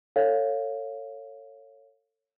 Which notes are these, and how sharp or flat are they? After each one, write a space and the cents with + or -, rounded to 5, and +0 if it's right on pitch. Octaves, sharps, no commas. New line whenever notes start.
A4 +30 C#5 +0 F5 +0